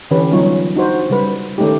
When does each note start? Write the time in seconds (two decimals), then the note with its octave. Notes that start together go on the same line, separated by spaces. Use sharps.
0.11 D3 E3 C#4 G4 B4
0.31 F#3 G3 B3 D#4 F4 C#5
0.75 D4 D#4 F#4 C5
1.09 C#3 G3 B4
1.58 D#3 A3 C#4 D#4 G4